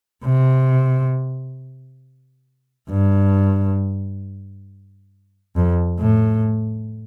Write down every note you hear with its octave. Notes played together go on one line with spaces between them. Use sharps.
C3
G2
F2
A2